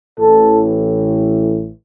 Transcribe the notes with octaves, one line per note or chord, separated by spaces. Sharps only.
A1 A2 E3 A4